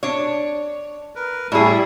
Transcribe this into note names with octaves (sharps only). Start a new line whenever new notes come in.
D4 C#5
A#4 B4
A2 G3 E4 G#4